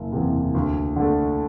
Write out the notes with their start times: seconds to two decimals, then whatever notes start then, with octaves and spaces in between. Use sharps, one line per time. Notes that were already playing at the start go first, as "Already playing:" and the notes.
Already playing: F#1
0.12 E2 C3
0.54 D2
0.96 D3 A3